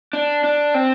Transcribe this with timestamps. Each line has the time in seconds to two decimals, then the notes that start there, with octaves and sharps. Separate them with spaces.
0.13 D4
0.44 D4
0.74 C4